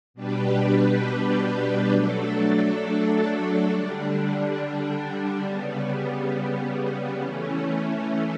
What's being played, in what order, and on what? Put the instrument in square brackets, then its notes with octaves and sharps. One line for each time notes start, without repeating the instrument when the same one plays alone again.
[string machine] B2 G3 D4 G4 B4
F#3 A3 D4 A4
D3 G3 D4
C#3 G3 B3
E3 A3 C#4